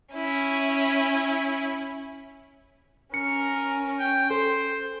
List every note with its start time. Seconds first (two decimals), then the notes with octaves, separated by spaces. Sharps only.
0.13 C#4 E4
3.14 C#4 A#4 C#7
4.00 G5
4.30 A4 C5